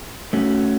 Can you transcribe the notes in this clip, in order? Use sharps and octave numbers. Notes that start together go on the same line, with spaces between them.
A3 C#4 F#4